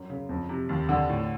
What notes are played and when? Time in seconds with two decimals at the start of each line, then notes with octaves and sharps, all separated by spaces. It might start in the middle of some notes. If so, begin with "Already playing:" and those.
Already playing: F#2
0.10 C#3
0.29 F2
0.49 C3
0.69 D#2
0.89 D3
1.09 A2